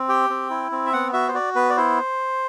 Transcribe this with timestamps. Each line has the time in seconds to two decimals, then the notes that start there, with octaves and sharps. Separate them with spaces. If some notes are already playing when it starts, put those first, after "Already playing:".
Already playing: C4
0.08 G4 G5
0.30 C4
0.50 E4
0.71 C4
0.86 E5
0.93 B3 F#5
1.13 F#4 E5
1.28 C5
1.34 F#4 D5
1.55 B3 B4
1.70 D5
1.77 E4 C5